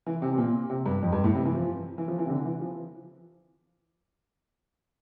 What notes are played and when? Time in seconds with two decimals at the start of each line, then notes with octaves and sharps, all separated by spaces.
0.06 E3
0.22 C3
0.33 C3
0.38 A#2
0.70 C3
0.86 G2
1.03 F2
1.12 G2
1.24 A2
1.35 C3
1.45 E3
1.55 F3
1.98 E3
2.08 F3
2.19 E3
2.26 C3
2.30 D3
2.45 E3
2.62 F3